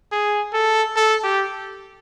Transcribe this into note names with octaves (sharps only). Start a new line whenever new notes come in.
G#4
A4
A4
G4